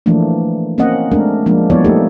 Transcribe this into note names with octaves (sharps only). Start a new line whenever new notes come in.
E3 F3 A3 A#3 D4
A#3 C4 C#4 D#5 F#5
G#3 A3 C4 D4 A#4
F3 G#3 A#3 D4
F3 G3 B3 E4 C#5 D5
A3 A#3 D#4 G4 A4